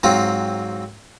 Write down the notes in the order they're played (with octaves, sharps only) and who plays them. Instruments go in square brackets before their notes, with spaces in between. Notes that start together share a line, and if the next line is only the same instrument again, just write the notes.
[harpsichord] G#2 F#3 C4 F4